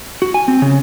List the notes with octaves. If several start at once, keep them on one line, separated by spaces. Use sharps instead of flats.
F#4
G#5
C4
C#3